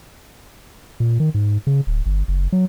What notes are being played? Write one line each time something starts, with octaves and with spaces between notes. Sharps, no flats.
A#2
D#3
G#2
C#3
D1
G1
F#1
F#3